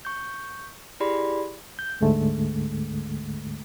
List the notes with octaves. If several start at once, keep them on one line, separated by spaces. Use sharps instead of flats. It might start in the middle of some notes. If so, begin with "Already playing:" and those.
C#6 G6
E4 G4 G#4 D5 B5 C6
G6
D2 G#2 D3 G#3 A3